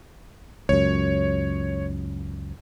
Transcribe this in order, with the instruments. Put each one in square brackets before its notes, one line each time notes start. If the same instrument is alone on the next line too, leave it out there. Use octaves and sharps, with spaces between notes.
[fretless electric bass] C#2 F#2 [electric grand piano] C#5